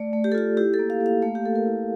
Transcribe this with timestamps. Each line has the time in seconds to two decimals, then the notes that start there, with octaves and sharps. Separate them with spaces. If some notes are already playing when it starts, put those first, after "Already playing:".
Already playing: A3 D5
0.13 A3
0.24 G4
0.32 A4
0.35 F4 G4
0.57 E4 G4
0.74 A4
0.79 A#3
0.90 F5
1.00 A#3
1.06 F5
1.22 A3 F5
1.35 G4
1.44 A3 A4
1.55 A#4
1.66 E4